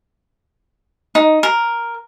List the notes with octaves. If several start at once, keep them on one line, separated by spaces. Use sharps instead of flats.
D#4
A#4